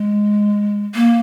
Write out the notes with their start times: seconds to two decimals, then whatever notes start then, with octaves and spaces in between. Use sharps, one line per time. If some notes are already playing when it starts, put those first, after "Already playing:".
Already playing: G#3
0.95 A#3